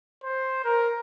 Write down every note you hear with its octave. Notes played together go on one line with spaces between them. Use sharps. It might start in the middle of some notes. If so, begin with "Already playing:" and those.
C5
A#4